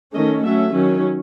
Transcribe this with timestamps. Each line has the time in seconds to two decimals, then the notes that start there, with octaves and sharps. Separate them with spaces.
0.14 D#3 A3 C#4 D#5
0.44 F#3 A3 C#4 E5
0.73 D#3 F#3 C#4